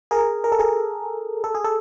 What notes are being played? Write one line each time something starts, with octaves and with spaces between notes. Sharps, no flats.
G#4 A#4
A#4
A4
G#4 A#4
A4
G#4
A4